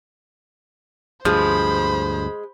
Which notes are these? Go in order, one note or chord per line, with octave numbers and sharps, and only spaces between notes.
D2 G2 F3 G#3 C5 B5